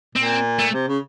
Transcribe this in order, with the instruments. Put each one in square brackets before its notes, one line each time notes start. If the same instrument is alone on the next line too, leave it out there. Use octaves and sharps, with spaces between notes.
[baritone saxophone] A#2 [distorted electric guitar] C4
[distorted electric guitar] A3
[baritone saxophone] C3
C#3